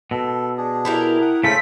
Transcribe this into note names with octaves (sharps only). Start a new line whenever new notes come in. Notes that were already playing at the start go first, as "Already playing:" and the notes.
B2 A4
D4 G#4
E4 G4 A#4
F#5 D#6
C#3 A3 C#4 A4 C5 B6